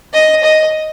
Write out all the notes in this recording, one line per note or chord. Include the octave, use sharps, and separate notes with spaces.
D#5
D#5